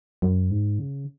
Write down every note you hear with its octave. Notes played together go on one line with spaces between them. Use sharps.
F#2
G#2
C#3